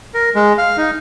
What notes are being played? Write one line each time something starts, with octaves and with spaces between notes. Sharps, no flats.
A#4
G#3
F5
D#4